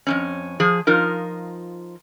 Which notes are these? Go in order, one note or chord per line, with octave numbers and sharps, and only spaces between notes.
F2 G#2 C#4
F3 G#4
F3 D#4 F4 A#4